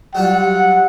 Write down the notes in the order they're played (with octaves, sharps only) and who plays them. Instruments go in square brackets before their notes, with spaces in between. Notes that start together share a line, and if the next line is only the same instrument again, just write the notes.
[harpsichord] F#3 G3 F4 [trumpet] F#5